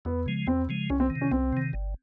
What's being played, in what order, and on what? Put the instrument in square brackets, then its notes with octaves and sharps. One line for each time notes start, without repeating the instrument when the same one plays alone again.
[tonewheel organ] E2 [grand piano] B3
[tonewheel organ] C#3 F3 G#3
[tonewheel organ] E2 [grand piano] C4
[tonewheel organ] C#3 F3 G#3
[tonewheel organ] C2 [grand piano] C#4
[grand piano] C4
[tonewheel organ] D#3
C3
[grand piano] C#4
[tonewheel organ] C2 [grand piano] C4
[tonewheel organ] C3 D#3
G1